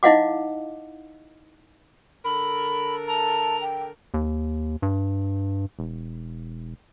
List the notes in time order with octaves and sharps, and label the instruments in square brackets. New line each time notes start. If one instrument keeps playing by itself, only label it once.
[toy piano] D#4 E4 D#5 F5 F#5 D6
[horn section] D3 A4 A#4 [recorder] B5
[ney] A5 [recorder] A#5
[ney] G5
[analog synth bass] D#2
G2
E1